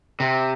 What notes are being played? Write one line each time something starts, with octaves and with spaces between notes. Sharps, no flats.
C3